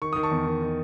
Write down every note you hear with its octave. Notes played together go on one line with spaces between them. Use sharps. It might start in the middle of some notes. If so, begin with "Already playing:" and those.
D#3 C#6
D#3 D#6
A5 C#6
E2
D#3
D#3